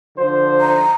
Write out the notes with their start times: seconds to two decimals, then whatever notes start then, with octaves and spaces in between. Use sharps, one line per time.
0.17 D3 F3 C5
0.61 A#5